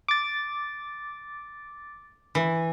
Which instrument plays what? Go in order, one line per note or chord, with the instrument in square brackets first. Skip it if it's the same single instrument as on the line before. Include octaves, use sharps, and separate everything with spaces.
[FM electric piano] D6 A6
[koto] E3